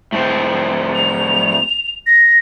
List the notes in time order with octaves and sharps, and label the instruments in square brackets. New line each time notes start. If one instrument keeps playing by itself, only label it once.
[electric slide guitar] A2 C4
[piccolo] F7
A#6